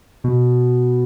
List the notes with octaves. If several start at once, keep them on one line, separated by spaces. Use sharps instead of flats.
B2